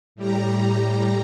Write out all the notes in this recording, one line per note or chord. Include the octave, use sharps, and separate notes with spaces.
A2 G3 G4 A#5